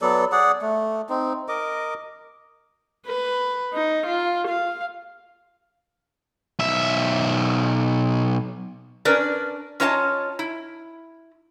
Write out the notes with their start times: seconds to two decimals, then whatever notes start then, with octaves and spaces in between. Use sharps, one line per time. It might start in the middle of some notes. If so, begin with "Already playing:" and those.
0.02 F#3 B3 A4 D5
0.32 G#4 D5 F#5
0.62 A3
1.09 C4 D#4
1.48 A#4 D#5 D6
3.07 B4
3.73 D#4
4.06 F4
4.48 F5
6.59 B1 E5
9.05 C#4 D4 A#4 B4 D5
9.80 C#4 F4 C#5 D#5 E5 A5
10.39 E4